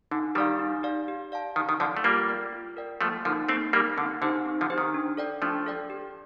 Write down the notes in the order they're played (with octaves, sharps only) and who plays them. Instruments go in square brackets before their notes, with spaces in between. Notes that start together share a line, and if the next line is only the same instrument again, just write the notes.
[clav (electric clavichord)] D3 [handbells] D#4
[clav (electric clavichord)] D#3 G3 [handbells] G4 D5 F5
[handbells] D#4
G4 D5 F5
G4
D5 F5 A5
[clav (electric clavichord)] D#3 [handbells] G4
[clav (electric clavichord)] D#3
[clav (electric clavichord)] D3 F3 [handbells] D5 F5 A5
[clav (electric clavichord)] A3
[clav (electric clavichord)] G3 A#3 [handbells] F4
[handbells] A#4 D5 G5
F4
A#4 D5 G5
[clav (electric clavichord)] F3 A3 [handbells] A#3
[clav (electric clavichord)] D3 F3 [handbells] D#4 A#4
[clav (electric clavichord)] A3 C4 [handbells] A#3
[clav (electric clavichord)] G3 A#3 [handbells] D#4 A#4
[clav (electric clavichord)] D3 [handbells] C4
[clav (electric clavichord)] D3 [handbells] D#4 G4 C5
[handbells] C4
[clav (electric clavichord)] D3 F3
[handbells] D#4 G4 C5
[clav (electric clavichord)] D#3
[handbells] D4
A4 D5 G5
[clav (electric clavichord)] F3 A3 [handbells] D4
[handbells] A4 D5 G5
G4